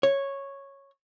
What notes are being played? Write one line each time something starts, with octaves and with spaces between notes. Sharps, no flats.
C#5